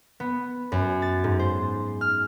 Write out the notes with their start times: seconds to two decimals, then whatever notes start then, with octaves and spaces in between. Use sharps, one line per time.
0.20 B3
0.72 F#2
1.02 A6
1.24 G#2
1.39 C5
2.01 F6